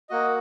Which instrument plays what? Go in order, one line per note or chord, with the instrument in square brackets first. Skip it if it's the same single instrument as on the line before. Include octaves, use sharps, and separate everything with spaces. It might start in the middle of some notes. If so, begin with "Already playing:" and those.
[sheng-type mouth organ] A#3 F#4 D#5